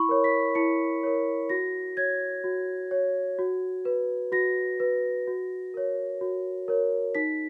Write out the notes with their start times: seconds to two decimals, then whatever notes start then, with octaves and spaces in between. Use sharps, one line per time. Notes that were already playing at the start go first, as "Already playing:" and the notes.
Already playing: E4 B5 C#6
0.09 A#4 C#5
0.24 B6
0.55 E4 C#7
1.03 A#4 C#5
1.49 F#4 A#6
1.97 C#5 G#6
2.44 F#4
2.91 C#5
3.39 F#4
3.85 B4
4.32 F#4 A#6
4.80 B4
5.27 F#4
5.74 A#4 C#5
6.21 F#4
6.68 A#4 C#5
7.15 D#4 B6